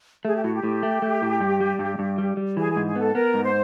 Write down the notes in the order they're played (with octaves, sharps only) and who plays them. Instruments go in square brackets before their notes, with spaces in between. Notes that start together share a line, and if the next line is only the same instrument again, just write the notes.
[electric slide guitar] A3 [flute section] G#4
[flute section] G4
[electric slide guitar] A2 [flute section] F#4
[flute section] G4
[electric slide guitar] A2
A3
A3
A2
G2
G3
G2
G2
G3
G3
[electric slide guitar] E3 [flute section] G#4
[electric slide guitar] G#2 [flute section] G#4
[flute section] G#4
[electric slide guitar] B3 [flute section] A4
[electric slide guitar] B3 [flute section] A#4
[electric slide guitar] G#2
[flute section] C5